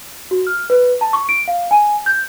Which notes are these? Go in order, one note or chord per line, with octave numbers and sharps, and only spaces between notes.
F#4
F6
B4
A5
C#6
D7
F5
G#5
G6